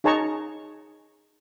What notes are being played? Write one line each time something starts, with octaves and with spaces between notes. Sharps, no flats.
D#4 G#4 C#5 A5 A#5 C#6